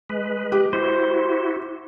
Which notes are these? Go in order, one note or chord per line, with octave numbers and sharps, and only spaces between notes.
G#3 B4
G4
E4 F#4 C5